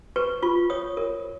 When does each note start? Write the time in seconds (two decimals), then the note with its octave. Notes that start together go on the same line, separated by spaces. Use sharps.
0.16 B4 C#6
0.42 F4 C#6
0.70 C#5 D#6
0.97 A#4